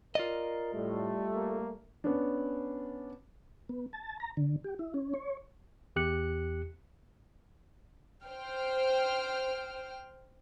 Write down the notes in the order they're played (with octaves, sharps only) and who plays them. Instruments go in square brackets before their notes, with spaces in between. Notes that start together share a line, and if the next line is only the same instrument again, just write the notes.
[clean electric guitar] F4 D5 D#5 [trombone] A#4
[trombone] A2 [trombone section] G3 A3
[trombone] A#3
[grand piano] B3 C#4 D4
[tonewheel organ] B3
A5
A#5
D3
G4
E4
C#4
C#5
[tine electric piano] E2 G4 F#6 C#7
[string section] C5 G5 F6